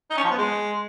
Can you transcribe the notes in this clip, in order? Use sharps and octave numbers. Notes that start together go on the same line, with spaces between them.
D#4
C#4
F3
B3
G#3